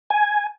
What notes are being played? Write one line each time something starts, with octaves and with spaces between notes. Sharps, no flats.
G#5